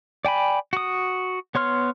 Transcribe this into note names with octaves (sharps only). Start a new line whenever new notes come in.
D5 G5 G#5 B5
F#4 D#6
B3 C#5 C6 F6